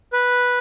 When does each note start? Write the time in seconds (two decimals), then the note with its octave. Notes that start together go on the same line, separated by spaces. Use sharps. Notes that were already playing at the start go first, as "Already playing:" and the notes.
0.13 B4